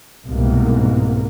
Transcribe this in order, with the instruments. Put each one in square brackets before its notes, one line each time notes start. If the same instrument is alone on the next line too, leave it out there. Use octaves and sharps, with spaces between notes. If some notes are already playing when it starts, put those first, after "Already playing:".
[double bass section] C2 G#2 B2 A#3